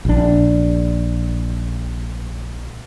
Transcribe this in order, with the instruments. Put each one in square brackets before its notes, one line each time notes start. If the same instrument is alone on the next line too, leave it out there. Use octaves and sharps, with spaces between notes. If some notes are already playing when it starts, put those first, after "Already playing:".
[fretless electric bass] A#1 D4